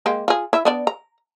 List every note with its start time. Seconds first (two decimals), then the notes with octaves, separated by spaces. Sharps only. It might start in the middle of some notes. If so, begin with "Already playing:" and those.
0.06 G#3 A#3 G4
0.28 F4 G#4
0.53 E4 E5
0.65 B3 D4 D5
0.87 A#5